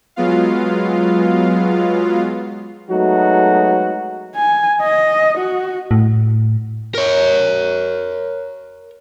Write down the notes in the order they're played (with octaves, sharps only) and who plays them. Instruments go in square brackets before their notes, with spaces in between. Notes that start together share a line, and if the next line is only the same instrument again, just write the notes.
[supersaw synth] F#3 G#3 B3 F4 F5
[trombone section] F#3 G#3 A3 B3 D#4 F#4
[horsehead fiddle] G#5
D#5
F#4
[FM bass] A2
[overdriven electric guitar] A#4 C#5